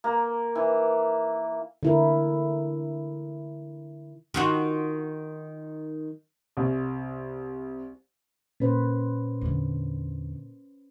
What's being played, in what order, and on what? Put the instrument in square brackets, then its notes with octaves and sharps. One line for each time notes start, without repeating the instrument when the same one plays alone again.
[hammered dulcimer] A#3
E3
[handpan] D3 E4 A#4
[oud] D#3 F4 F#4
[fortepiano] C2
[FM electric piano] A#2 [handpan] C#4 B4 C5
[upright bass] E2 D3